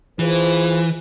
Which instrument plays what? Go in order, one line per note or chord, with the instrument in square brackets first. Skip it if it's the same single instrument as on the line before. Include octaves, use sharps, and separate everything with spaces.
[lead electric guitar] E3 [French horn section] F4 G#4 C5